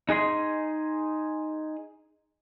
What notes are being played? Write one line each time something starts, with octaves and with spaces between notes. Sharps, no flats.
D#4 G#4 D#5 C6